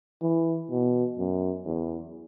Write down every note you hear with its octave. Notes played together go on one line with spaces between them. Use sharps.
E3
B2
F#2
E2